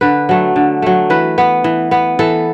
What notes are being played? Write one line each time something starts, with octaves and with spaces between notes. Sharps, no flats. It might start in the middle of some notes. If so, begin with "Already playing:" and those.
D3 B4
F#3 A3
D3
F#3 A3
E3 B4
B3
E3
B3
E3 A4